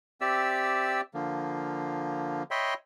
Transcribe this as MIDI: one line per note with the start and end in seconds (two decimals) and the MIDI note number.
0.21 1.01 60
0.21 1.01 67
0.21 1.01 74
0.21 1.01 76
0.21 1.01 88
1.14 2.43 50
1.14 2.43 53
1.14 2.43 58
2.51 2.74 73
2.51 2.74 75
2.51 2.74 76
2.51 2.74 79
2.51 2.74 83
2.51 2.74 84